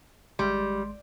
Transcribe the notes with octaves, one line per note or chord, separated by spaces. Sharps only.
G#1 G3 G#3 C6